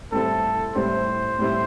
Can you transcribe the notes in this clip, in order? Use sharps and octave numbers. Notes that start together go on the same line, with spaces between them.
A2 G3 C4 E4 A4
A2 G3 C4 E4 C5
A2 G3 C4 E4